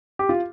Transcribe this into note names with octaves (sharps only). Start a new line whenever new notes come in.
G4
F4